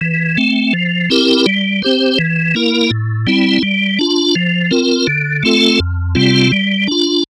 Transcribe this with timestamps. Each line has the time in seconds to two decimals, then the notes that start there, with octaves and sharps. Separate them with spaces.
0.01 E3
0.37 A3 C4
0.73 F3
1.10 C4 E4 G4 A#4
1.46 G3
1.82 C4 G4 C5
2.19 E3
2.55 A#3 E4 A#4
2.91 A2
3.27 G3 C4 E4
3.63 G3
3.99 D4 F4
4.36 F3
4.71 C4 F4 A#4
5.07 D3
5.43 A3 C4 F4 A4
5.80 F2
6.15 C3 G3 C4 F4
6.52 G3
6.87 D4 F4